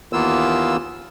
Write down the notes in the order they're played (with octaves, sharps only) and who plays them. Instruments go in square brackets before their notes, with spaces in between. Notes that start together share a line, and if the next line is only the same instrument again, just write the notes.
[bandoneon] D#2 E3 A#3 B3 F4 E6